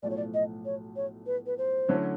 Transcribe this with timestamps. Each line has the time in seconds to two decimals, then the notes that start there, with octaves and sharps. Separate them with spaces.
0.03 B1 A2 F3 A3 D5
0.10 C#5
0.17 D5
0.34 D#5
0.65 C#5
0.96 C#5
1.26 B4
1.46 B4
1.58 C5
1.88 D3 F#3 A3 C#4 E4